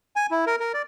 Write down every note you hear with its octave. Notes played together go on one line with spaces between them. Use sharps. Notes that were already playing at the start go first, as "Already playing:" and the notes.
G#5
E4
A#4
A#4
D5